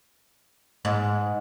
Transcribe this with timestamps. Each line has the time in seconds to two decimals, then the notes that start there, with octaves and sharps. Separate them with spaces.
0.85 G#2